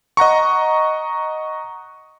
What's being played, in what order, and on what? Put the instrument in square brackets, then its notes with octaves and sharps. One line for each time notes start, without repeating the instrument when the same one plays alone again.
[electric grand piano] D#5 F#5 A#5 C#6